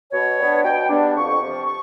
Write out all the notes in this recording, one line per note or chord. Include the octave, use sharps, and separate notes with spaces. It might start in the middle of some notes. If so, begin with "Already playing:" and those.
B2 C#5
G3 B3 D4
B2 G5
G3 B3 D4
F2 C#6
C3 F3
C#6